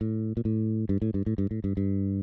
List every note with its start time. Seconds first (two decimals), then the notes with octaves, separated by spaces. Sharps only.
0.01 A2
0.37 A#2
0.45 A2
0.89 G2
1.02 A2
1.14 G2
1.26 A2
1.38 G2
1.51 A2
1.64 G2
1.77 G2